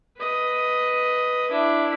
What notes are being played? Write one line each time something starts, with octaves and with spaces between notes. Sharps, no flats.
B4 D#5
D4 E4